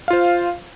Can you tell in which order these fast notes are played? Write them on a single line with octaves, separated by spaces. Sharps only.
F5 F4 C5